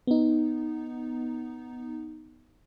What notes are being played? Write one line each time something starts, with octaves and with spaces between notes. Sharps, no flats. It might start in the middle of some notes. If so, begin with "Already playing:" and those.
B3 D#4